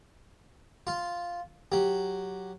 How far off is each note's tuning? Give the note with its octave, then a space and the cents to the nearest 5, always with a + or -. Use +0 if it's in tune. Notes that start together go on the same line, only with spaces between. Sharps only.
F4 +0 C6 +0
F#3 +0 G4 +0